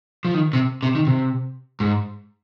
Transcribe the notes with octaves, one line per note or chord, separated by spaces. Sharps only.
F3
D#3
C3
C3
D#3
C3
G#2